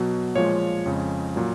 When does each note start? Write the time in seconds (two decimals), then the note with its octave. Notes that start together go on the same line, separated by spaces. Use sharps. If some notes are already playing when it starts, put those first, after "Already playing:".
Already playing: B2 F#3
0.36 A#2 F3 G#3 C#5
0.86 F2 C#3 G#3
1.36 A#2 F#3